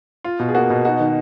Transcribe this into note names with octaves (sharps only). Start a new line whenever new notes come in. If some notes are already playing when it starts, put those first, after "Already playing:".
F4
B2
G#4
A#3 F#4
B2
D#4 F#4
D#3